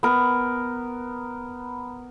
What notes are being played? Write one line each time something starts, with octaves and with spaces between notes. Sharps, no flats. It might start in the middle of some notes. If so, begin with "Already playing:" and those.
B3 A#4